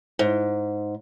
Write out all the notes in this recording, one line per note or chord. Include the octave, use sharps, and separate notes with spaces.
G#2